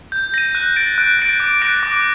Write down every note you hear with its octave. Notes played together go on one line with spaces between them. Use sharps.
G6
A#6 D#7
F#6
A6 D7
F#6
A6 D7
D6
F#6 A#6 D7
D6